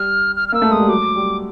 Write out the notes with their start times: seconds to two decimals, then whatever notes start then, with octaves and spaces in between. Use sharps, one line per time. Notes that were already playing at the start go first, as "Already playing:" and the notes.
Already playing: G3 F6
0.36 F6
0.49 F6
0.52 A#3 E6
0.62 A3
0.70 G#3 D#6
0.79 G3
0.88 F#3 D6
1.16 G3